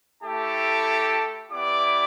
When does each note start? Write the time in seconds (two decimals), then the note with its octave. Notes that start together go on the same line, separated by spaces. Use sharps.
0.22 A3 E4 G4 A4 A5
1.51 B3 E4 G4 D5 D6